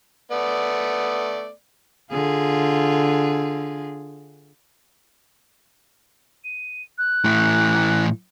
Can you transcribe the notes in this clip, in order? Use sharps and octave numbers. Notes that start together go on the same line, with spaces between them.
A3 B3 D5
D3 F4 G#4
D#7
F#6
A2 E3